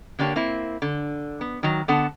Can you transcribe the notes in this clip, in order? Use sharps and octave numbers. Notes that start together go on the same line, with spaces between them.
D3 A#3 D4 G4 C#5
A#3 C4 E4
D3
B3
D#3 F#3
D3 B3 F#5 A5